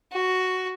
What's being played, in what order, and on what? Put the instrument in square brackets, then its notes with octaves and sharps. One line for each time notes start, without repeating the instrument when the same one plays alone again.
[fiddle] F#4